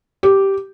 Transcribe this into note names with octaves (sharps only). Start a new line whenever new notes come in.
G4